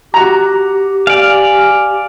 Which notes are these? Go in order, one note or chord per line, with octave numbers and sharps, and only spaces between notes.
F#4 G4 A#5
D5 F5 G#5